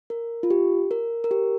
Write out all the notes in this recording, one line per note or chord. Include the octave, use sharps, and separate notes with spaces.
A#4
F4
G4
A#4
A#4
G4